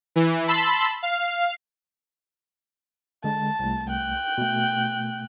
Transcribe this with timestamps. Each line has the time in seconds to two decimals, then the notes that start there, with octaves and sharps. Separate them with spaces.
0.16 E3
0.48 A5 B5 C6 E6
1.03 F5
3.24 D3 G#3 A5
3.59 C2 A3
3.90 G5 F#6
4.38 B2 A3